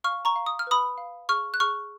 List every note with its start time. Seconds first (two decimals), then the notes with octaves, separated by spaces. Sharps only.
0.04 F5 C#6 F6
0.25 A#5 C#6
0.36 F5
0.46 D#6
0.59 F6
0.67 B4 B5 D#6
0.98 F5
1.29 G#4 C#6 F6
1.54 F#6
1.60 G#4 C#6 F6